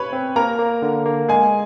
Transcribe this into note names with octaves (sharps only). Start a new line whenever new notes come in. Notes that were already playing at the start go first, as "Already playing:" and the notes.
Already playing: B4 C#5 B5
C4
A#3 A#4 A#5
A#3
D3
A#3
G#3 G#4 G#5